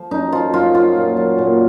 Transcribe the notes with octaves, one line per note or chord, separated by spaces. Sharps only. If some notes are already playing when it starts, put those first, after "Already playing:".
Already playing: F3
F#2 D#4
F3 F4
F#2 F4
F#3 F4
A#2
F#3
A#2